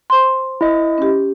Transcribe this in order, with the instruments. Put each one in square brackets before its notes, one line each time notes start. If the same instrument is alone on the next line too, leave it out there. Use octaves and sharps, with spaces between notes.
[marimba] C5 C6
[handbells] E4 D#5
[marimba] C#4 G4